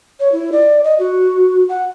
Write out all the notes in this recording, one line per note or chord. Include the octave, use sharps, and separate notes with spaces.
C#5
E4
D5
D#5
F#4
F#5